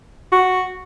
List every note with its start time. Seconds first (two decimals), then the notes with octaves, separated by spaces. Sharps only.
0.32 F#4